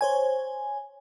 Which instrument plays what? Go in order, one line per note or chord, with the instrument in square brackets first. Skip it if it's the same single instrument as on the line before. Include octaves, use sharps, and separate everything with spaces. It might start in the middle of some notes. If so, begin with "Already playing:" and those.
[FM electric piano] C5 C#5 G#5